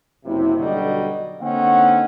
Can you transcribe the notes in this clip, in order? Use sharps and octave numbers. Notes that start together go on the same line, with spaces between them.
F#1 C3 E4
B1 D3 F#3 G3 D#5
D3 A#3 C4 C#4 D#4 F#5